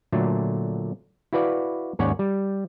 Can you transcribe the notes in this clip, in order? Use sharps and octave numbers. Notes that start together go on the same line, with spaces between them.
A#2 D3 F#3 A3
E4 F#4 B4 D5 F5
D#2 G#2 C#4 C#5 D5 F#5
G3